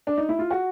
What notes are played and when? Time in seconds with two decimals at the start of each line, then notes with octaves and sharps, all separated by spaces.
0.07 D4
0.17 D#4
0.29 E4
0.39 F4
0.51 F#4